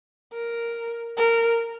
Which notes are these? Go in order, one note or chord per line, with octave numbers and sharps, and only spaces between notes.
A#4
A#4